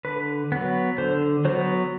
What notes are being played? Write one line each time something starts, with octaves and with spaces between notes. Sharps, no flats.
D3 B4
F#3 B3
D3 C5
F#3 B3 C5